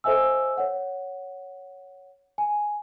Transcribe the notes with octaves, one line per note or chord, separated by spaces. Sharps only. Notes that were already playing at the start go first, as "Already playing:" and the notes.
A4 C5 D#5 E5 G#5 E6
C#5 F#5
G#5